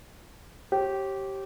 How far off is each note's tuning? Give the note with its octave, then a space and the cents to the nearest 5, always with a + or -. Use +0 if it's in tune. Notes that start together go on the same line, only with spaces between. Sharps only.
G4 -15 C#5 -40